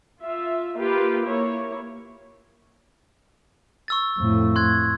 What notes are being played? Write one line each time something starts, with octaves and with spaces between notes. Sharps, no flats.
F4 E5
A#3 F4 G4 B4
A#3 E4 C#5
C#6 E6 A6
F2 A2
C6 F#6 G#6